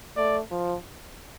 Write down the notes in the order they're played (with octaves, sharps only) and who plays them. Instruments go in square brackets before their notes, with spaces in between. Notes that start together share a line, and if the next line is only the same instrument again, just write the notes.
[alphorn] A3 [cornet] D5
[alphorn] F3